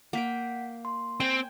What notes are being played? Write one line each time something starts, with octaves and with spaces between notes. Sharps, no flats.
A#3 F#5 G5 B6
C6
C4 G5 G#5